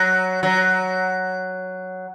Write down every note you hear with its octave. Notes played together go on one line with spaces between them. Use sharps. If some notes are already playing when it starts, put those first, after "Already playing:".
Already playing: F#3
F#3